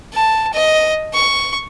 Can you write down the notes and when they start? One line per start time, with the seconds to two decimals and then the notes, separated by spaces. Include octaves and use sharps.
0.13 A5
0.54 D#5
1.14 C#6